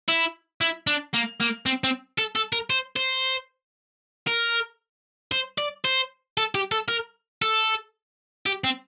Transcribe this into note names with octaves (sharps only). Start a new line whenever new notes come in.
E4
E4
D4
A#3
A#3
C4
C4
A4
A4
A#4
C5
C5
A#4
C5
D5
C5
A4
G4
A4
A#4
A4
G4
C4